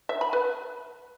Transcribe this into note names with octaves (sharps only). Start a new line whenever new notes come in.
E5
B5
B4